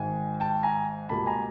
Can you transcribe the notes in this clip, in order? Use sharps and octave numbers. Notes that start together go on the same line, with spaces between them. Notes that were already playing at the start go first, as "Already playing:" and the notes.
Already playing: G#1 G#2 D#3 G#3 G#5
G5 A5
G#5 A#5
C#2 B2 G3 A#3 A5 B5
G#5 A#5